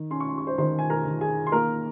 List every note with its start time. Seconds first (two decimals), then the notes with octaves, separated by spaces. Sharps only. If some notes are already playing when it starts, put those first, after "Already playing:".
Already playing: D#3
0.11 C#4 C6
0.20 C#6
0.29 C6
0.38 C#6
0.47 C5 C6
0.58 D#3 C5 C6
0.79 G#5
0.90 A#4 A#5
1.05 D#3
1.21 G#4 G#5
1.47 C6
1.52 A#3 A#4 A#5